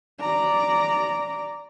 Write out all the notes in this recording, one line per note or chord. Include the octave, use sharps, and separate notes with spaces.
D5 A#5